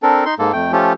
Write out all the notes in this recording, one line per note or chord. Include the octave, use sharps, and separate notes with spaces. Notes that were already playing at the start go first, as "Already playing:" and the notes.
C4 D4 A4 A#4
D#4 C6
G#2 G#3 A#3 A4
F2 A3 G5
F3 A3 C#4 F4 G4 A4